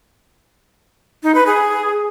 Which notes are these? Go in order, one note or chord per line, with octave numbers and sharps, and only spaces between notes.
D#4
B4
G#4